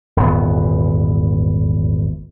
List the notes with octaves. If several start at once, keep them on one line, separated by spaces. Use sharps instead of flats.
D#1 G#1 E2 B3